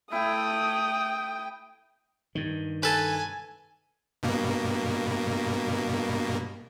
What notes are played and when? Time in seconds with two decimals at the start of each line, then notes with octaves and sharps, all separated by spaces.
0.12 A3 E4 G5 D#6
2.35 G2 D#3
2.83 A4 B4 G#5
4.23 G2 B2 A#3